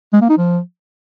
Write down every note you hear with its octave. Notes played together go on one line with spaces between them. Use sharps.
G#3
A#3
D#4
F3